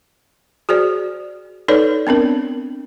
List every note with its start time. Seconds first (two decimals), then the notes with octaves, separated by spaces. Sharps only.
0.69 F#4 G#4 C5 D5
1.68 D#4 A4 B4 C#5 D5
2.07 B3 C4 D4 A#4